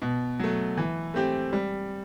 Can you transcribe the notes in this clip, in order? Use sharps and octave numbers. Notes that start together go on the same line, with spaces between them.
B2
F#3 A3
E3
A3 C4 G4
G3